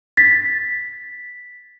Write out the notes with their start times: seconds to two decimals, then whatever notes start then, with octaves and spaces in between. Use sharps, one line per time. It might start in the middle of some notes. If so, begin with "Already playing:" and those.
0.17 A6 B6